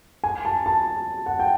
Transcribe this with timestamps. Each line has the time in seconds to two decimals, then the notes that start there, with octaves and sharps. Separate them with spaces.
0.24 G#5
0.45 A5
0.66 A5
1.26 F#5
1.39 G5